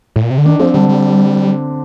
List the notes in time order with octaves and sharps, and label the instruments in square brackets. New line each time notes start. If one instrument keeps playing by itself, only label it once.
[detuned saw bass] A2
A#2
C3
D3
[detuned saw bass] D#3 [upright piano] D4
[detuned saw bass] F3 [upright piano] C4
[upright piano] D3 [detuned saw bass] G3
[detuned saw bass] G3